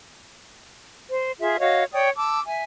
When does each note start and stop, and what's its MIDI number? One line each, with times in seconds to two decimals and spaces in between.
1.08 1.32 72
1.39 1.57 65
1.39 1.57 68
1.39 1.57 76
1.60 1.84 66
1.60 1.84 73
1.60 1.84 75
1.60 1.84 77
1.93 2.09 73
1.93 2.09 74
1.93 2.09 79
1.93 2.09 87
2.16 2.39 81
2.16 2.39 86
2.16 2.39 88
2.45 2.63 76
2.45 2.63 80